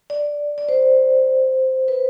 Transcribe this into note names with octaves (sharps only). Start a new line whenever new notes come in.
D5
D5
C5
B4